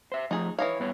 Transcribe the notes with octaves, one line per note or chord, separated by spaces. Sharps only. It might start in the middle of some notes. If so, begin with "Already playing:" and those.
C5 E5
F3 A3 D#4 G#4
E3 C#5 D#5 F5
G2 B3 C#5